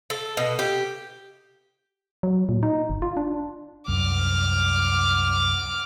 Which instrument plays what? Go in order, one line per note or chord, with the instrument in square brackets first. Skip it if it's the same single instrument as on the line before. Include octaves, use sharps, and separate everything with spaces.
[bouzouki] A4
B2
G4
[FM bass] F#3
A#2
D#4
G1
F4
D4
[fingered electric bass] C2 F#2 [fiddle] D6 F6